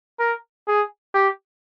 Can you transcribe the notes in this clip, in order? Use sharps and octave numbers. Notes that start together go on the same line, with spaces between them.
A#4
G#4
G4